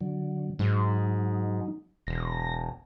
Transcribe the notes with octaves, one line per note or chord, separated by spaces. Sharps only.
D3 F#3
G#2 F#3 D#4
E1 A#6